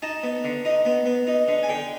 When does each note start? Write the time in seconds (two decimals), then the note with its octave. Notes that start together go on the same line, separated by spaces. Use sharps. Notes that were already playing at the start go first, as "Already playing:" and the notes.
0.02 D#4 A5
0.23 B3
0.44 D3
0.65 D#4
0.85 B3
1.06 B3
1.27 D#4
1.48 D3
1.63 G#5
1.69 D3 G5